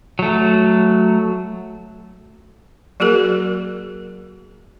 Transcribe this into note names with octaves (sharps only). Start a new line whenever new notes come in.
F#3 A3
F#3 A#3 F#4 G#4 A#4